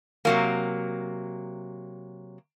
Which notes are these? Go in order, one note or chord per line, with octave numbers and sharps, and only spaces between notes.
C3 F#3 A#3